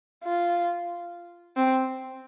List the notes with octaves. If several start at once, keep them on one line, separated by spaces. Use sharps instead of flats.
F4
C4